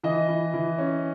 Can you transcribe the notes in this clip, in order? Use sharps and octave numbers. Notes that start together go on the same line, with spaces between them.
E3 D#5
E3
E3
C#4